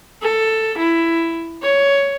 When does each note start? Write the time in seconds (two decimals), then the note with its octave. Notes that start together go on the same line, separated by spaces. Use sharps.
0.22 A4
0.78 E4
1.63 C#5